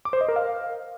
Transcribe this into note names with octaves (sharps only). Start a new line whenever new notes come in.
D6
C5
D#5
A#4
F5